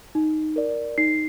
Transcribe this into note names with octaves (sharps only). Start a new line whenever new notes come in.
D#4
A#4 D5
D#4 C7